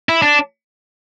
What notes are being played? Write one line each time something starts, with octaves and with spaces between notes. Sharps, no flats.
E4
D4